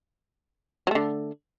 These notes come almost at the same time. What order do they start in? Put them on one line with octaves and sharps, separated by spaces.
F#3 A3 D3